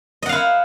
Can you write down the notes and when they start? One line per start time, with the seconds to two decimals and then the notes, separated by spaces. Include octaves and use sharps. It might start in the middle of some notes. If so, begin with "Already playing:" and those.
0.22 D#5
0.26 F#5
0.29 F5
0.32 E4